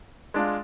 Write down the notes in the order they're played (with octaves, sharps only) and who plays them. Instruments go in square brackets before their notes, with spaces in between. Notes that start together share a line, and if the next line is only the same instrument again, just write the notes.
[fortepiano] G#3 D4 F4